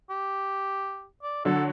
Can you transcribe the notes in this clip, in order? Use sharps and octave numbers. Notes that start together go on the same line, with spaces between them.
G4
D5
D3 F#3 A4